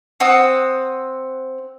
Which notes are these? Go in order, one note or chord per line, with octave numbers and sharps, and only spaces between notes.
C4 F#5 D#6 E6